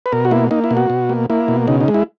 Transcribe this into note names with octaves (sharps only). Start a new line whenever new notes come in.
B4
B2 A#4
F#4
A#3 E4
A#3 D#4
E4
B2
F#4
B2
A#3
A#3 E4
B2
C#3 D#4
D#4
G#3
E4